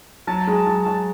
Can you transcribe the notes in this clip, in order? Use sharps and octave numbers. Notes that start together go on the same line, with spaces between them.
F#3 A5
G#3
F#3
F#3